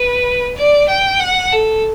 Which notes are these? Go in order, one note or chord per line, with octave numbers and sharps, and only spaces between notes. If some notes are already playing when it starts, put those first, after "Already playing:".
Already playing: B4
D5
G5
F#5
A4